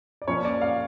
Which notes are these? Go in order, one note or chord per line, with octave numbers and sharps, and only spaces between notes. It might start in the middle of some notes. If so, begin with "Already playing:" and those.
D5
A#2 F3 A#3 C#4 C#5
D5
F5